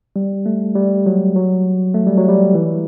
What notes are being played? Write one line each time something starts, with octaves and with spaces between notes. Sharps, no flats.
G3
A3
G3
F#3
F#3
A3
G3
F#3
G3
E3